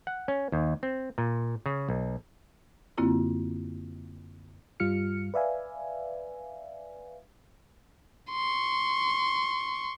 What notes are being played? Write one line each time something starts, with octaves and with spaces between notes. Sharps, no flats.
F#5
C#4
D#2
C4
A#2
C#3
B1
F#2 D3 A#3 C4 E4 F4
G2 G3 F4 F6 C#7
B4 D5 E5 F5 G#5
C6 C#6